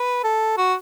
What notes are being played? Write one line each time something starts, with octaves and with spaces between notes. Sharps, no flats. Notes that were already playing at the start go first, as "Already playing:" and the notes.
Already playing: B4
A4
F#4